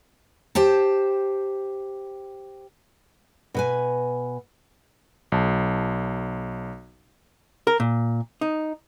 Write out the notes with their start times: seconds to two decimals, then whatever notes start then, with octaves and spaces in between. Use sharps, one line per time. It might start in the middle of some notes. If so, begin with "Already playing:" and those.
0.55 G4 C5 G5 A5
3.54 B2 B4 G#5
5.32 B1 A5
7.67 A#4
7.80 A#2
8.41 D#4